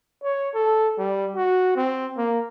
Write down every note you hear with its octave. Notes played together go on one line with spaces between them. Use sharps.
C#5
A4
G3
F#4
C4
A#3